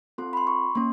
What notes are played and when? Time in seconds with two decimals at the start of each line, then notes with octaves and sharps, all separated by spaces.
0.18 C4 F4 A4 C6
0.33 B5
0.37 C6
0.47 C#6
0.75 A#3 C#4 C6